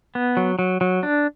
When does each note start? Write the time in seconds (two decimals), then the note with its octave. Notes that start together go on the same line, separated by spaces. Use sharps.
0.15 B3
0.37 F#3
0.59 F#3
0.81 F#3
1.03 D4